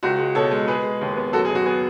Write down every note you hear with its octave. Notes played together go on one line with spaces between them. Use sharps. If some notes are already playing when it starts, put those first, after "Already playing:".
C#2 F#4
G#3
B2 A4 C#5
G#3
G#3 G#4 B4
G#3
D#2
B3
F#2 F#4 A4
G#4
F#2
F#4
B3 G#4